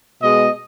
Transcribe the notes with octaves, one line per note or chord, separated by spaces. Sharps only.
B2 G#3 D#5